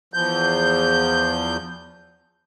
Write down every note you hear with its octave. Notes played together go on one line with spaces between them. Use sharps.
E2 F3 G6